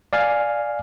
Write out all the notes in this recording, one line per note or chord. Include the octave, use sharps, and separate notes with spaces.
D5 F5 G#5